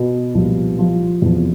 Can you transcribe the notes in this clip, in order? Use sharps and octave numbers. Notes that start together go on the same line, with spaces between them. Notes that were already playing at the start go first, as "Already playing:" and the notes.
Already playing: B2 B3
C2 A#2 F3
F3 F4
E2 C3 F3